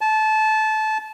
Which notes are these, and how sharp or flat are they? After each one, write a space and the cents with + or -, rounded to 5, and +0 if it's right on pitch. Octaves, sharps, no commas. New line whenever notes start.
A5 -20